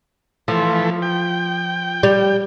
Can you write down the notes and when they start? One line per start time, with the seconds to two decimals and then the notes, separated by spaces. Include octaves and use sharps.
0.48 E3 F3 A3
1.02 G5
2.03 G3